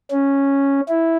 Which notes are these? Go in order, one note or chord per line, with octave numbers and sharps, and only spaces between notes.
C#4
E4